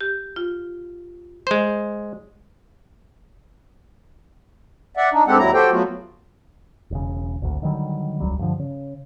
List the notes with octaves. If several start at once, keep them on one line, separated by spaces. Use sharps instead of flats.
G4
F4
G#3 C5
D5 E5 F#5
D4 D#4
G2 G#3 C4 G4 A4 F#5
D#2 F#3 G3 E4 A#5
F#4 G4 A4 C5 G5
F#3 A3 B3 F4 F#4
E1 C#3
G#1 D2
D3 D#3 F#3 G3
E1 C#2 F#3 G3
G2 D3 F3
C#3